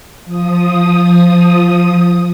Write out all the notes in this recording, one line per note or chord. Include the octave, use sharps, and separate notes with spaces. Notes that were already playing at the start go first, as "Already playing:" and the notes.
F3 D#6